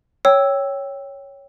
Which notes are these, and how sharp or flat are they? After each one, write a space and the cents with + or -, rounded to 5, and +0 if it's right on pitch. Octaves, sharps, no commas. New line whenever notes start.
C#5 +0 G5 +0 E6 +0